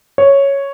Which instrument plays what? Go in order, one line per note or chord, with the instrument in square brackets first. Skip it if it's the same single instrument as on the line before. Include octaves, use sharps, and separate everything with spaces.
[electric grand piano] C#5